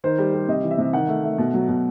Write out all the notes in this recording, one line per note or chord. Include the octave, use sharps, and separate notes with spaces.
D#3 C5
G3
G3
C3 D#5
E3
E5
C3
D#3 F#5
A3
A3
B2
F#3
B2